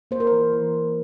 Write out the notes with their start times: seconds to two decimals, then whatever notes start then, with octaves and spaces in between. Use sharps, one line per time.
0.11 A#3 C5
0.20 A#4
0.27 E3 C5
0.53 E3
0.74 A#3